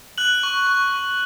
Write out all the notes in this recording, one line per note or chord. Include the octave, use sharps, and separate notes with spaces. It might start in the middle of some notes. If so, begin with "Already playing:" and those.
F#6 F#7
C#6
C#6
C#6